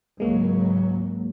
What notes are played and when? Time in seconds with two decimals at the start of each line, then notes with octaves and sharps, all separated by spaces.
0.20 G#1 C#2 F#3 G#3 A#3